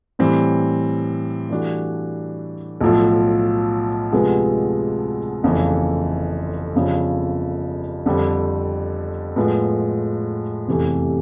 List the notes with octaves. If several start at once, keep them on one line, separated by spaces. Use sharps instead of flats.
A2 E3 G3 C4
G2 E3 A3 D4 F#4
B1 A2 F3
D2 C3 F3 G#3 B3
G1 F2 C#3 E3 A3
G1 F2 C#3 F3
F2 D3 G3 C4
A2 F3 G#3 B3
F1 E2 C3 E3 A3